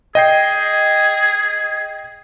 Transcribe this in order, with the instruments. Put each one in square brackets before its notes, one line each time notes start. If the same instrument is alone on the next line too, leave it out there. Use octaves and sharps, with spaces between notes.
[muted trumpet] G#4 [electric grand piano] D#5 G5 C7